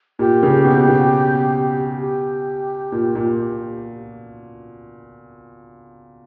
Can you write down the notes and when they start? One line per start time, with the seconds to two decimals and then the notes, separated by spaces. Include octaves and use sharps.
0.19 A#2 G4
0.43 C#3
0.64 B2
0.88 B2
2.01 G4
2.92 A#2
3.15 A#2